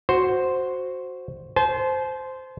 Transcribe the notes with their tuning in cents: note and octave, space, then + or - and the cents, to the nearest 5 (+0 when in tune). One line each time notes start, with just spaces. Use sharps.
F#4 -5 C5 +0
C5 -10 A5 -45